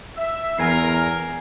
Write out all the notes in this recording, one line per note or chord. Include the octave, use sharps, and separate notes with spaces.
E5
E2 A#4 G#5 G#6 C7